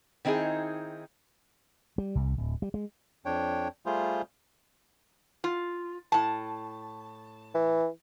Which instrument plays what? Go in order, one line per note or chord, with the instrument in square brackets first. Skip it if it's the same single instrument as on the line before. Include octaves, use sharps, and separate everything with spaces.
[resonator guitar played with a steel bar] D#3 C4 D#4 E4 G#4
[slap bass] G3
C2
D1
G3
G#3
[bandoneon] F2 D4 C#5 G5
G3 A3 F4 G#4 C5
[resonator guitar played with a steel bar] F4
A2 A5
[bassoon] E3